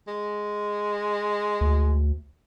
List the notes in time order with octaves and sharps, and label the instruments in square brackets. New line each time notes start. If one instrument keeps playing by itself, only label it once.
[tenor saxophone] G#3
[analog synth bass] D2